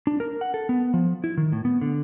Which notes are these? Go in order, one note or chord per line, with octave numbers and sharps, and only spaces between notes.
D4
A#4
F#5
A4
B3
F3
E4
D#3
A2
B3
D3